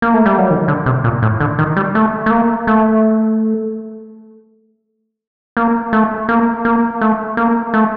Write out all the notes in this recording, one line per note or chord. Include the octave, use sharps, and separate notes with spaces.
A#3
A3
G3
F#3
D#3
D3
C3
A#2
A2
D3
D#3
G3
A3
A3
A#3
A3
A#3
A3
A#3
A#3
A3
A#3
A3